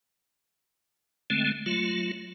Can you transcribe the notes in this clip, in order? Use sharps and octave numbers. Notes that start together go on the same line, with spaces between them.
D3 G#3 A3 C4
F#3 A3 F4